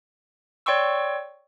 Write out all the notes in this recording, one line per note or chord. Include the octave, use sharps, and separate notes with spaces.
C#5 D5 G5 C6 C#6 E6